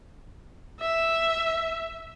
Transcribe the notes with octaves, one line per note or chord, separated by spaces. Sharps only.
E5